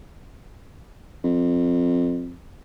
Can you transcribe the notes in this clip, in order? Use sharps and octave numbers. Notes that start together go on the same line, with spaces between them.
F2